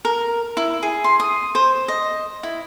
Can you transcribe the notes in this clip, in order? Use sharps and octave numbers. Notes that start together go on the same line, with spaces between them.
A#4
E4
G#4
C6
D#6
C5
D#5
E4